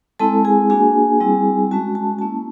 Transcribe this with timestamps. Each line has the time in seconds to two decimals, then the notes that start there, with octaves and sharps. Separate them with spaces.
0.20 G#3 C4 E4 A4 A5
0.45 G#4 G#5
0.70 A#3 D4 F#4 G#4 G#5
1.20 G3 C4 E4
1.71 G#3 C#4 F#4 A5
1.95 A5
2.19 A#3 C#4 E4 A5